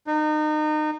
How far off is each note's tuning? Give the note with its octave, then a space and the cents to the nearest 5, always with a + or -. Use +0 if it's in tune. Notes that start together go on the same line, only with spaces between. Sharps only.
D#4 -30